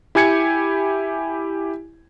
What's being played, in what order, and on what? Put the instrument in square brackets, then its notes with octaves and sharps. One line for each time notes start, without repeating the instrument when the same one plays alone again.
[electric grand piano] E4 G4 G#5 G#6 C#7